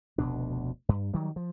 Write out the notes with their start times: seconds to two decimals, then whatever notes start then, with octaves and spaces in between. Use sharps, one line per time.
0.18 F1 D2 B2 D4
0.89 G2
1.13 D#3 F#3 G3
1.36 F3